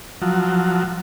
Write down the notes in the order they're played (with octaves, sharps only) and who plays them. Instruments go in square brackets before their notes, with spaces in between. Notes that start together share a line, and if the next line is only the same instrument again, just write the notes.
[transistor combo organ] F3 F#3